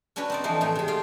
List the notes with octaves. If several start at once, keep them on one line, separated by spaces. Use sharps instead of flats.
C#4 D4 F#4 B4 C#5
C4 D#4 D5
E3 F3 A3 D#4
A2 D#3 A3
C3 G#3
F4 F5 G5